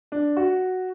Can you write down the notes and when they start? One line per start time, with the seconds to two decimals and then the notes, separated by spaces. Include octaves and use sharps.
0.12 D4
0.37 F#4